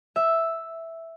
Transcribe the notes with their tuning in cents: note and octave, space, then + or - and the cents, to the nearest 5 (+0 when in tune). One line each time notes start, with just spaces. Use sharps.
E5 +0